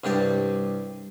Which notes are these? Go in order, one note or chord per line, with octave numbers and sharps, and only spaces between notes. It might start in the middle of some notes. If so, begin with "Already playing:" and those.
C2 G2 G4 D5